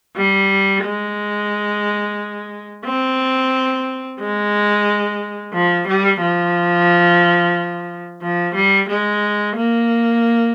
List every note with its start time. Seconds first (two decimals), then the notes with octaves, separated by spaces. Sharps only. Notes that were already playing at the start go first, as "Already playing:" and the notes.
0.17 G3
0.84 G#3
2.85 C4
4.20 G#3
5.53 F3
5.87 G3
6.21 F3
8.22 F3
8.55 G3
8.89 G#3
9.56 A#3